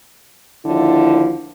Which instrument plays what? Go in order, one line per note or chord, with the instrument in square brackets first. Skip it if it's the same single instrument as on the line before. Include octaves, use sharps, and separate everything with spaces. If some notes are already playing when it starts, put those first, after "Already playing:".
[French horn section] D#2 D3 F3 E4